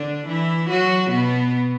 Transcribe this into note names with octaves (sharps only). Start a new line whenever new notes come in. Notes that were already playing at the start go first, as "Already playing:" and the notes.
Already playing: D3 D4
E3 E4
F#3 F#4
B2 B3